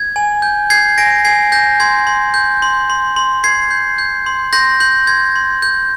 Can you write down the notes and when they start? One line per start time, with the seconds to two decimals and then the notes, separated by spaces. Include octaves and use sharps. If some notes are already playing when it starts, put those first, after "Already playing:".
Already playing: G#6
0.16 G#5
0.42 G6
0.70 G6 G#6 C7
0.98 G#5 A#6 D7
1.25 G#5 G#6 C7
1.52 G#5 G6 A#6
1.80 C6 G#6
2.07 C6
2.34 G6
2.62 C6
2.90 C6
3.16 C6
3.43 C6 G#6 C7
3.71 G6
3.98 G6
4.26 C6
4.53 C6 G6 A#6
4.80 C6 G6
5.07 C6 G#6
5.36 C6
5.62 G6